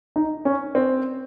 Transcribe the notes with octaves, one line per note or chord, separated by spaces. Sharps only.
D#4
C#4
C4